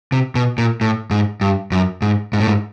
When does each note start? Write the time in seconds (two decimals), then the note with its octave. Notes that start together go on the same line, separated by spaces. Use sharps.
0.12 C3
0.35 B2
0.58 A#2
0.81 A2
1.11 G#2
1.41 G2
1.72 F#2
2.02 G#2
2.33 G#2
2.40 A2
2.48 G#2